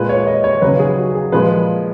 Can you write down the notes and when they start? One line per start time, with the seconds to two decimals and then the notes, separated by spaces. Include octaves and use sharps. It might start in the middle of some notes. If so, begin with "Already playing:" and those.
Already playing: A#2 G#3 B4
0.09 C#5
0.26 D#5
0.44 C#5
0.61 D#2 C#3 F#3 B4
0.79 G#4
0.97 F#4
1.15 G#4
1.32 A#2 F3 G#3 B4